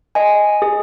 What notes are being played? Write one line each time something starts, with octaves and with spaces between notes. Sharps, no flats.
D#5 G#5
G#4